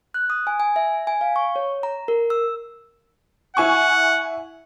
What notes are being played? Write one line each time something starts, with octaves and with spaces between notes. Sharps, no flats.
F#6
D#6
G#5
G#5
E5
G#5
F5
C#6
C#5
A#5
A#4
E6
E4 F#5 G#5 C#6